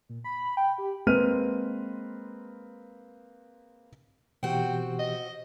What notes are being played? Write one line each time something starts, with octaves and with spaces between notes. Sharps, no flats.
A#2
B5
G5
G4
G#3 A#3 C4 B4 F6 D#7
B2 E3 C4 F#4 G4 G5
D#5